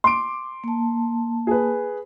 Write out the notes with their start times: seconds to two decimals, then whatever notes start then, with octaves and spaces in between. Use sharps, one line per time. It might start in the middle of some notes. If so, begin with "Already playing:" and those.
0.04 C6 D6 D7
0.64 A#3 A5
1.47 G#4 B4